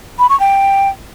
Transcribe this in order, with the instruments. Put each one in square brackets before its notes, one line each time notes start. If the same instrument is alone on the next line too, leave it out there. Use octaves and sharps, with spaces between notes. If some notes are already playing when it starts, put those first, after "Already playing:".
[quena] B5
C#6
G5